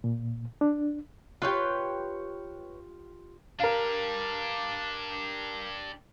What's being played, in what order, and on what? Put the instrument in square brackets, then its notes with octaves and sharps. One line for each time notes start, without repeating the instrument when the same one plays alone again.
[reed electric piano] A#2
D4
[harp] F4 G4 [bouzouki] B4 C#5 G5
[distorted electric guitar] D4 G4 [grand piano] A#4 F5